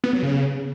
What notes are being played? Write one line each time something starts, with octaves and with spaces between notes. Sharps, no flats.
B3
F#3
C#3